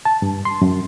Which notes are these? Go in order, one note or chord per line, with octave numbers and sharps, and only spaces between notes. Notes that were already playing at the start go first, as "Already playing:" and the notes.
A5
G2
C6
F#2